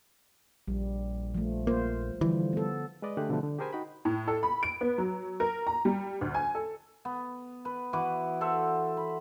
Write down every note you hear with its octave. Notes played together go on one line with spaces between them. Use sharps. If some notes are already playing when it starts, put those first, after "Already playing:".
A#1 G3
F3 A3
A#3 F4 C5
D3 E3 F3 G3
B3 A4
G#3 B4 D5 D#5
D3 A3 G4 G#4 F#6
B2 D3 F3 G3 A3
D3
G4 G#4 A#4 C5 G#5 B5
D#4 F#4 G5 B5
A2
A4
B5
D7
B3
F#3
A#4
A#5
G3
D2
G#5
A4
B3
B4
E3 F#4 B4 D6
A4 C5 E5 F#5
B5